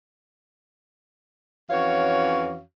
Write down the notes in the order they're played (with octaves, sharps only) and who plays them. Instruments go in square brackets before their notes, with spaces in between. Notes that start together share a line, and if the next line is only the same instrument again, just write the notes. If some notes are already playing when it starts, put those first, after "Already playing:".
[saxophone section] F2 E3 C#4 F#4 C#5 F5